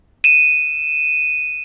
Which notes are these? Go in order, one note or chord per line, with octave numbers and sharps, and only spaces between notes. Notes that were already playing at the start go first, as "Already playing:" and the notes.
D#7 E7